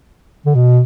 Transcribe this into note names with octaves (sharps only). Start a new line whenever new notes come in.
D3
B2